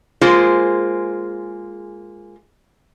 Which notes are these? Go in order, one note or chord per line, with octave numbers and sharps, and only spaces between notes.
G#3 A#3 F4 G#4 C5